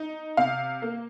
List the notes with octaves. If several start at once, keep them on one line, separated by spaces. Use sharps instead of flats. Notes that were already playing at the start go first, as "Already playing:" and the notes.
Already playing: D#4
C3 F5
A#3